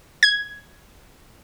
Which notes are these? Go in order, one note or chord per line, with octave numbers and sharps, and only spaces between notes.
G#6